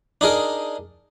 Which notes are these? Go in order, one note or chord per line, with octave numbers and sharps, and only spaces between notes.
D4 D#4 G#4 A#4